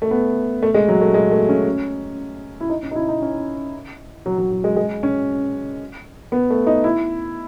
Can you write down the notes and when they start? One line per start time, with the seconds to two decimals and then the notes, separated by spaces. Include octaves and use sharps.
0.02 A3
0.11 B3
0.63 A3
0.74 G#3
0.88 F#3
1.01 A3
1.14 G#3
1.31 A3
1.49 C#4
2.60 E4
2.70 D#4
2.83 C#4
2.91 D#4
2.96 E4
3.09 D#4
3.22 C#4
4.26 F#3
4.38 F#3
4.51 F#3
4.64 G#3
4.76 G#3
5.03 C#4
6.32 B3
6.50 A3
6.67 D#4
6.84 E4